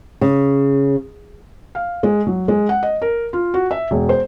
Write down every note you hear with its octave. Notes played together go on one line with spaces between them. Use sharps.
C#3
F5
G#3
F#3
G#3
F#5
D#5
A#4
F4
F#4
E5
E1
C5